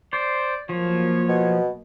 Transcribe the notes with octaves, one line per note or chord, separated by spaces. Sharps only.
C5 D5
F3 F#3 A#3 C#5
B2